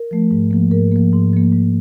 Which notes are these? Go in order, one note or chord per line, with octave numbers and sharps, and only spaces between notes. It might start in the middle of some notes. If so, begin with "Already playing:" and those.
Already playing: A#4
F3 A3
G#2
F3 A#3
G#2 A#4
F3 A#3
G#2
F3 A#3
G#2